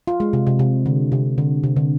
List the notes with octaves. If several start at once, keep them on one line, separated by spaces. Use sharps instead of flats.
F4
G#3
C3
C3
C3
D3
C3
D3
C3
D3